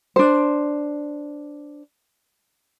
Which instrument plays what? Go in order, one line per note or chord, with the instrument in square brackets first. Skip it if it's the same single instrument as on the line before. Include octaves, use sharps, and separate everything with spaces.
[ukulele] D4 C5